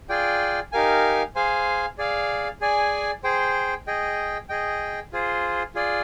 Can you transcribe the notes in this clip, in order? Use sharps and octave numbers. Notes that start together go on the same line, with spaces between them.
F4 G#4 D5 G5
D#4 G4 A#4 F5 G#5
G#4 C5 F5 G#5
G#4 D5 F5
G#4 D5 G#5
G#4 C5 G5
G#4 D#5 G5
G#4 D#5 G5
F4 G#4 C5
F4 G#4 D5